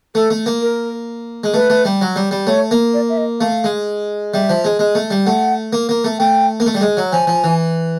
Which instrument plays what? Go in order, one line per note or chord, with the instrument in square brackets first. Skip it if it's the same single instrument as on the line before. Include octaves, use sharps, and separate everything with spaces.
[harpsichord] A3 [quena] A4
[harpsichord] A3
A#3
[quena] A#4
[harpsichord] G#3
[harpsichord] A3 [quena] B4
[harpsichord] A3
G3
F#3
G3
G3
[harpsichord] A3 [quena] C#5
[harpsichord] A#3
[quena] D5
E5
D#5
[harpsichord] A3 [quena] F5
[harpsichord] G#3
[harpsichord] G3 [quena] E5
[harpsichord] F3
G#3
G#3
A3
G3
[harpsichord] A3 [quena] F#5
[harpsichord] A#3
A#3
A3
[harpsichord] A3 [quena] G5
[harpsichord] A#3
A3
G3
G#3
F#3
[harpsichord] F3 [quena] G#5
[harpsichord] F3
E3